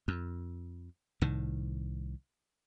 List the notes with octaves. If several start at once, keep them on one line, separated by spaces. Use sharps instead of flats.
F2
C2 A2 D#3